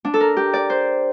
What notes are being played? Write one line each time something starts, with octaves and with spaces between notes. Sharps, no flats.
D4
A4
A#4
G4
D5
C5